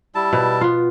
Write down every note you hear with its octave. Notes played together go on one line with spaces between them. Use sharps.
G3 E4 A5
B2
B3 F4